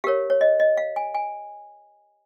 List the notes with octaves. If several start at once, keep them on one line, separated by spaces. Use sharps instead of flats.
G4 A#4 C#5 F5
C#5
D#5
D#5
F5
G#5
G#5